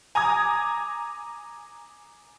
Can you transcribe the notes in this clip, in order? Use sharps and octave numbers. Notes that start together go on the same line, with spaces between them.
G#5 A#5 D6 D#6 G#6